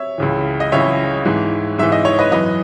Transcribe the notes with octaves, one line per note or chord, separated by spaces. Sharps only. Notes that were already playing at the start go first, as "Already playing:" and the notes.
Already playing: C#5 E5
C#2 C#3 E3
D#5
C#2 C#3 E3 C#5 E5
G#2 E3
G#2 E3 E5
D#5
C#5
B4 D#5
F#2 E3 B4 D#5